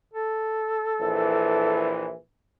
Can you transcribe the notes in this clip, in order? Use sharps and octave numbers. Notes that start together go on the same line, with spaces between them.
A4
A#1 E3